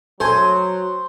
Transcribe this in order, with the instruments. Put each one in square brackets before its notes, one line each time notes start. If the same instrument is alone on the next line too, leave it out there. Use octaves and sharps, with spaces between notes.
[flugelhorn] F#3 [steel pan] A4 G#5 [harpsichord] C5